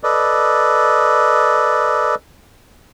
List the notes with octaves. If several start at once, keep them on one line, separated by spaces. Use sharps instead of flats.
A4 B4 D5 D#5